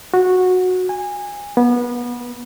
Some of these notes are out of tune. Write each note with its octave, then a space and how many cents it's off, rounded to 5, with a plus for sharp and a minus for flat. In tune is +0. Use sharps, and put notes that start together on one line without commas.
F#4 -15
G#5 -25
B3 -25